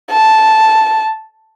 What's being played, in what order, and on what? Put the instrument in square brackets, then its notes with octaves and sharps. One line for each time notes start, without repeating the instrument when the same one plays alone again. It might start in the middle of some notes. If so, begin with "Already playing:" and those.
[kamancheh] A5